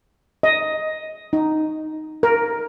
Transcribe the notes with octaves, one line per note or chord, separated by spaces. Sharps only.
D#5
D#4
A#4